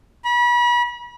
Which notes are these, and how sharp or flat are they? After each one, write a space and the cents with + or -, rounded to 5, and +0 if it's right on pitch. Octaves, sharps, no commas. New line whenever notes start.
B5 -35